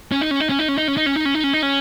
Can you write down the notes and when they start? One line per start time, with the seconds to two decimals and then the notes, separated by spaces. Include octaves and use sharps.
0.12 C#4
0.21 D#4
0.31 C#4
0.40 D#4
0.50 C#4
0.59 D#4
0.68 C#4
0.78 D#4
0.88 C#4
0.97 D#4
1.06 C#4
1.16 D#4
1.25 C#4
1.35 D#4
1.44 C#4
1.53 D#4
1.63 C#4